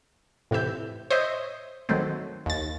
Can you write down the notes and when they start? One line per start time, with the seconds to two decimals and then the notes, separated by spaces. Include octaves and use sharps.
0.51 A2 C3 E3 E5 G6
1.11 C5 C#5 D#5 E5
1.89 D#3 F#3 A3 C4
2.46 D#2 A6